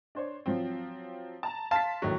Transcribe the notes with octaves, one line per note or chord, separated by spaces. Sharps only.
D4 C5 C#5
F3 F#3 C4
A5 A#5
F5 A5 C6 A6 B6
G1 D#2 A2 F#3